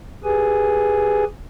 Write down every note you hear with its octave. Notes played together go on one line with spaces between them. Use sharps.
G4 G#4 B4 G#5